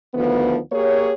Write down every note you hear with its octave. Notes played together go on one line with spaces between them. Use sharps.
D2 D#3 F3 B3
A#3 G4 G#4 C#5